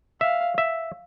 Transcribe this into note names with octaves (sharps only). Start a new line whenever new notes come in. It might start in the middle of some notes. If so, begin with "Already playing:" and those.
E5 F5
E5